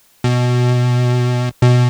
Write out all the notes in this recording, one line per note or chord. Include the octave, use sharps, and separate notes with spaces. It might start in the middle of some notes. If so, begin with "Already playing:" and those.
B2
B2